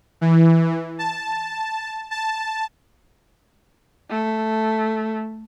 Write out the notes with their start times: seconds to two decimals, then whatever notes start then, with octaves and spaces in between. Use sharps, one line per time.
0.21 E3
0.99 A5
2.11 A5
4.10 A3